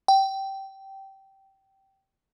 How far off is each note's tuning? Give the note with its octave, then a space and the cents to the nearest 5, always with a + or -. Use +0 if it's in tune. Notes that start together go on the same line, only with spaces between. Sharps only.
G5 -15